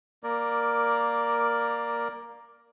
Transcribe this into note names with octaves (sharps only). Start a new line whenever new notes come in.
A#3 A#4 D5